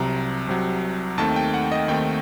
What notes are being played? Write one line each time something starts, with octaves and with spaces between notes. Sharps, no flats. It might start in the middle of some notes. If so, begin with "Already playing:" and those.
Already playing: C2 C3 F#3 A#5
C2 C3 F#3
D#2 D#3 A3 C4 A5
G5
F#5
D#5
D#2 D#3 A3 C4 G5